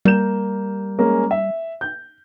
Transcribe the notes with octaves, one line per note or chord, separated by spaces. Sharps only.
G3 A#3 G6 E7
G#3 A#3 C#4
E5
G6